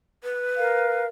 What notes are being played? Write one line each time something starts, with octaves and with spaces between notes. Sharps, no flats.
B4
A#4 F5